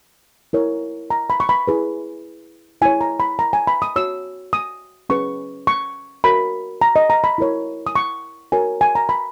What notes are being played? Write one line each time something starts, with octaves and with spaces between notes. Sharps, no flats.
E4 A#4 C#5
A#5
B5
C#6
B5
E4 G#4 B4
E4 G#4 C#5 G#5
A#5
B5
A#5
G#5
B5
D#6
F#4 C#5 E6
D#6
C#4 G#4 B4 C#6
C#6
F#4 A#4 C#5 B5
A#5
D#5
A#5
B5
E4 A#4 C#5
D#6
C#6
F#4 A#4 C#5 G#5
G#5
A#5
B5